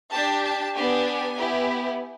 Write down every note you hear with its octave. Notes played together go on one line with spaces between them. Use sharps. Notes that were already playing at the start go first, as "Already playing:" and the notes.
D4 G4 A5
A5
B3 D4 G4 G#5
B3 E4 G4